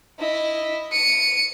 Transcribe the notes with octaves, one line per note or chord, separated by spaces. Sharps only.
E4 D#5
C#7 D#7